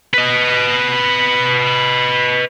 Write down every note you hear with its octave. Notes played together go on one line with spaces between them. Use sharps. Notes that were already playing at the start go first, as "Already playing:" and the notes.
B4 D#5